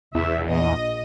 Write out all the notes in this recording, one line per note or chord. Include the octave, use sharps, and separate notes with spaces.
E2 E5
A#1 D#5